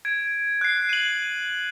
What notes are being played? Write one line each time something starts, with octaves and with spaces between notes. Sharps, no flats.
G#6 D7
F#6 C7
D#7 F#7